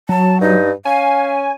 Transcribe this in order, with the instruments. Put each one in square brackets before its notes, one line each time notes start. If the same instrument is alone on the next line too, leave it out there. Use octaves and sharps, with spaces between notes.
[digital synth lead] F#3 [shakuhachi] A5
[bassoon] G2 [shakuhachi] D#4
[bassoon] C#4 [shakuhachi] F5 [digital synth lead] G#5